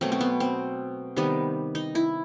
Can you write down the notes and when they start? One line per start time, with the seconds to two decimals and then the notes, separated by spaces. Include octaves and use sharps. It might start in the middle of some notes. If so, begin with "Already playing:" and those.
0.01 B2 F#3 A3 C4
0.12 C4
0.21 B3
0.40 C4
1.16 C3 D#3 G3 B3
1.75 D#4
1.95 E4